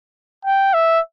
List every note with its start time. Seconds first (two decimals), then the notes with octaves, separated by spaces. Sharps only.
0.45 G5
0.74 E5